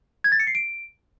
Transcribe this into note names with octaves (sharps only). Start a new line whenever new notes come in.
G#6
A6
C#7
C7
D7